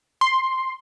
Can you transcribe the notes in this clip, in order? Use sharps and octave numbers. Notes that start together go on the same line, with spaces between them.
C6